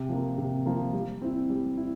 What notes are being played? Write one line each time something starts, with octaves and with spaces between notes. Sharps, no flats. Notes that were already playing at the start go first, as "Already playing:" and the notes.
Already playing: C3
F3 A#3
C3
F3 A#3
G3
C4 E4
G3
E4